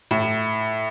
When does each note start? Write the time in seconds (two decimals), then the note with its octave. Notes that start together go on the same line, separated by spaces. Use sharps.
0.11 A2